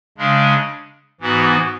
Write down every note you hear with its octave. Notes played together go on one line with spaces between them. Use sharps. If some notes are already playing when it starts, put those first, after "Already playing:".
C#3 G#3 D4
G#2 E3 B3 F#4